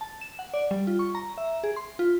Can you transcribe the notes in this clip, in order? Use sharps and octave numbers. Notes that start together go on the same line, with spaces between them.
A5
E7
F#5
D5
G3
F4
C#6
A#5
E5
G#4
C6
F4